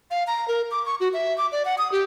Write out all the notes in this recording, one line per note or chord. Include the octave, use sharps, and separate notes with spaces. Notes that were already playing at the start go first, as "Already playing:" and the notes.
F5
A#5
A#4
D6
C#6
F#4
E5
D6
D5
F#5
D#6
G4